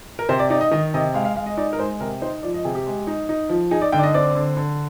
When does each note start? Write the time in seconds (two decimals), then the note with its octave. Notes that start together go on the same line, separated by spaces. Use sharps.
0.19 A#4
0.29 C3 C5
0.39 D5
0.50 D#4 D5
0.61 D#5
0.71 D#3 D#5
0.94 C3 D#5
1.14 G#3 F5
1.25 F5
1.36 G#3 F5
1.46 D#5
1.57 D#4 D5
1.73 A#4
1.79 G#3 C5
2.00 C3 A#4
2.21 D#4 C5
2.43 F3 D5
2.54 D#5
2.65 C3 G#4
2.75 G4
2.86 G#3
3.07 D#4
3.29 D#4
3.50 F3
3.71 D#4 G#4
3.82 D5
3.92 D3 G5
3.99 D5
4.03 D#5
4.14 C4 D5
4.35 D3
4.57 D3